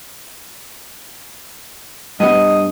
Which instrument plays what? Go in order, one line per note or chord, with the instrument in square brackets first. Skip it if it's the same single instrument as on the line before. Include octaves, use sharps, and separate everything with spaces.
[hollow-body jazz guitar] G2 B3 [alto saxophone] D#5